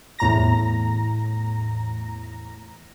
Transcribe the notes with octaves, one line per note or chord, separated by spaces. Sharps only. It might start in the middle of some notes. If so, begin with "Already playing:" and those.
E2 A2 A#5 A#6